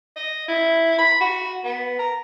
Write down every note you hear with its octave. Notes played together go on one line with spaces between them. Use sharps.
D#5
E4
B5
F#4
B3
A#5